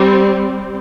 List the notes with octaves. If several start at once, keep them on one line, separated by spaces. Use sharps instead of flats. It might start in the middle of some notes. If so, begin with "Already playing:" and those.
Already playing: G3 C4